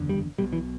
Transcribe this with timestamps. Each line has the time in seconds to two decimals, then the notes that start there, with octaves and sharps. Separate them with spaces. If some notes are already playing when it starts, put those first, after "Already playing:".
Already playing: F#1 E2 D3
0.09 G3
0.38 B1 B2 G3
0.53 E3